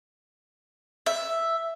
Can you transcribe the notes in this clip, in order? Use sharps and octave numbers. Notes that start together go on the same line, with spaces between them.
E5